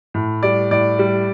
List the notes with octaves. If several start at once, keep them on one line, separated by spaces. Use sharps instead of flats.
A2
G3 D5
A2 D5
G3